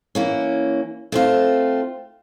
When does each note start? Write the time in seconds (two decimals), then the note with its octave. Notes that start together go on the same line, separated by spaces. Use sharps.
0.15 E3 A#3 C#4
1.12 A3 C4 F4